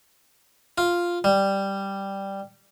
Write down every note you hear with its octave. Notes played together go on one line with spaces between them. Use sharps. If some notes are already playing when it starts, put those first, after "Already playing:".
F4
G3